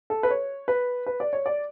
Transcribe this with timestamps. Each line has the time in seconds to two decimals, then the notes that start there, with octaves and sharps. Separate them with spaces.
0.10 A4
0.23 B4
0.30 C#5
0.68 B4
1.06 B4
1.20 D5
1.33 C#5
1.46 D5